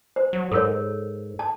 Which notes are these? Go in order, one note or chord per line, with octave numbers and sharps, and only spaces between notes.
C5
F#3
G#2 A4 A#4 C#5
A5